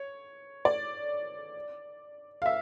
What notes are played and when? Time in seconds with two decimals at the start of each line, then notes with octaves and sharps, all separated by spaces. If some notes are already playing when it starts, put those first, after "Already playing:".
Already playing: C#5
0.65 D5
2.42 F5
2.46 E5